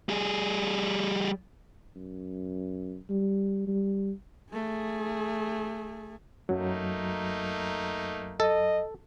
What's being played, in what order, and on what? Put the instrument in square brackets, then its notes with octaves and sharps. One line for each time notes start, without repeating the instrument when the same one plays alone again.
[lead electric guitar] G3 G#4
[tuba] F#2
G3
G3
[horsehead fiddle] A3 G#4
[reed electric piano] F#2 F#3 [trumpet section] A3 A#3 D#4
[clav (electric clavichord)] A4 [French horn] D#5